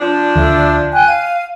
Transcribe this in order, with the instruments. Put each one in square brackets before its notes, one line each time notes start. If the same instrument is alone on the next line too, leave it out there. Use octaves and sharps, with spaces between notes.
[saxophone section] F3 D4
[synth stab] D2 [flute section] E5
[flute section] G5 G#5 F#6
[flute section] F5 [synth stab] D#7